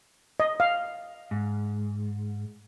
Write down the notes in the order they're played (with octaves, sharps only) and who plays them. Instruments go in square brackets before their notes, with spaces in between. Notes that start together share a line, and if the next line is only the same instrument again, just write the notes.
[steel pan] D#5
F5
[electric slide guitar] G#2